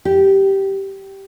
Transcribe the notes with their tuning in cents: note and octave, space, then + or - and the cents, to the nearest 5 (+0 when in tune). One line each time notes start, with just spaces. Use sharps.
G4 -10